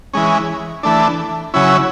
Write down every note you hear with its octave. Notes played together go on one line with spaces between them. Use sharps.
E3 G#3 C#4
E3 A3 D4
C#3 F#3 C#4 E4